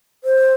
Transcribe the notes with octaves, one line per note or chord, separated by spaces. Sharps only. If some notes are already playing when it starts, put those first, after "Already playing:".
C5